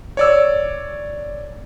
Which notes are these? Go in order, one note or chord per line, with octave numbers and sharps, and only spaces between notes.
C#5 D5 E6